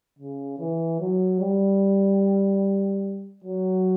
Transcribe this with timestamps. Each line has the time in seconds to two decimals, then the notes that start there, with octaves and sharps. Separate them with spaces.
0.19 C#3
0.59 E3
1.00 F#3
1.41 G3
3.44 F#3